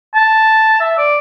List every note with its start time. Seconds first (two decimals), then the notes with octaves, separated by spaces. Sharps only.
0.15 A5
0.81 E5
0.98 D5